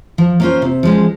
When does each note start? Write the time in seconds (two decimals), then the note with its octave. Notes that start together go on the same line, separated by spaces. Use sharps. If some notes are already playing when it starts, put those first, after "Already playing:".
0.18 F3
0.40 A#3 C#4 F4 C5
0.62 C3
0.83 F3 G#3 C#4